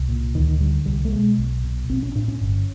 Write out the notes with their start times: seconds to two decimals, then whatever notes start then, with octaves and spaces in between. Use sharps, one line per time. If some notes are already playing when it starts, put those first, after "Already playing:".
Already playing: C2
0.09 A#2
0.35 D2 D#3
0.60 D3 G3
0.86 C2 G3
1.05 A3
1.12 B2 G#3
1.38 B1
1.64 B2
1.89 A#1 C4
2.03 C#4
2.15 A2 D4
2.28 C#4
2.41 G1